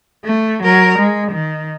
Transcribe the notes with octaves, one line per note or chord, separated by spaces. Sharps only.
A3
F#3 A#4
G#3
D#3